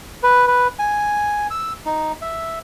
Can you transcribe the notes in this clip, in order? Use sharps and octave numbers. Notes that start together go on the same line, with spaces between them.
B4
B4
G#5
E6
D#4
E5